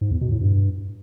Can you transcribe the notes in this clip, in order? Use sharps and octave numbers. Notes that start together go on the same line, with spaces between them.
G#2
E2
B2
A2
G2